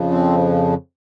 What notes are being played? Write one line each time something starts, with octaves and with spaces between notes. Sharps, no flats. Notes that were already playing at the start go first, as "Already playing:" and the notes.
Already playing: F2 C#3 F3
C4